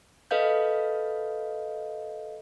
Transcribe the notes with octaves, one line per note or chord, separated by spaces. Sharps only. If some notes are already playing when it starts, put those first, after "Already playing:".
A4 B4 D#5 F5 G6